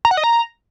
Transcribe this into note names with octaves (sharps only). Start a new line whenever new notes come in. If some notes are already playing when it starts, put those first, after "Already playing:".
A#5
F#5
D#5
A#5